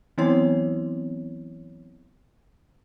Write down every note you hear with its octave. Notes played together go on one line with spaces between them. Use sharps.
E3 F#3 B3 C4 E4 C#5